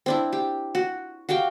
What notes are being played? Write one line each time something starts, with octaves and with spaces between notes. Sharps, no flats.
C4 D4 E4
G4
F#4
F#4 G4 F5 G5